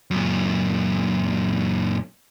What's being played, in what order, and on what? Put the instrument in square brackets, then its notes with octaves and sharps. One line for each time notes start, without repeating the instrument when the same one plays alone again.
[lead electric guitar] F#2 A#2